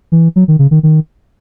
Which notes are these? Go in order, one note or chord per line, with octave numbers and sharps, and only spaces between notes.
E3
F#3
D#3
C#3
D#3
D#3